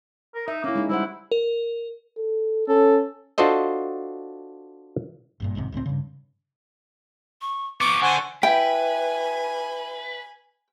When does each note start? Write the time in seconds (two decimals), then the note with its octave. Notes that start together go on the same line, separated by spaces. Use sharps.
0.35 A#4
0.48 D#4 E5
0.64 A#3 C#4 E4
0.75 G#3 D#4
0.89 G3 E4 C5 F#5
1.31 A#4
2.17 A4
2.68 C#4 A4
3.38 D4 F4 F#4 A4 C5 D#5
5.40 G1 G2 A#2
5.55 A#1 D#2 G#2 C3
5.72 D#1 C#2 A2 C4
5.86 G2 C#3
7.41 C#6
7.81 F3 B3 C#6 D6
8.02 D3 D4 C5 F#5 G#5
8.43 E4 B4 G5 G#5